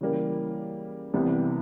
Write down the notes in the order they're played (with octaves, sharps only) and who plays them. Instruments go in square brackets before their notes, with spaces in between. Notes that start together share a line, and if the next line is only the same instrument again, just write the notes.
[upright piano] C#3 E3 G3 A#3
C2 C3 E3 G3 B3